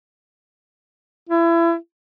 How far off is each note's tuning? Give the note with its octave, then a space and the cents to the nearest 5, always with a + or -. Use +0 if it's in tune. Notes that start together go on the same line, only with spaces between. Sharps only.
E4 +30